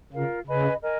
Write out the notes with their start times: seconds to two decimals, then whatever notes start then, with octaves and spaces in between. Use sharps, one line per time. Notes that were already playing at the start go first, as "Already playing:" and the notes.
0.12 C#3 F4 A#4 F5
0.46 C#3 B4 D#5 G#5 B5
0.81 A#4 D#5 G#5